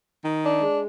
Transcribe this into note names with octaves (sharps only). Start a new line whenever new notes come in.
D#3
D4
G#3